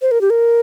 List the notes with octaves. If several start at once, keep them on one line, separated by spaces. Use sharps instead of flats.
C5
A#4
G4
A#4